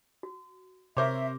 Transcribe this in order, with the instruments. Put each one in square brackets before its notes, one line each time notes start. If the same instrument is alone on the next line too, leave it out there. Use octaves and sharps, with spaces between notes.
[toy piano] F#4
[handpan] C3 [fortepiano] A#4 C5 C#5 [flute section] E5 [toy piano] C6 D6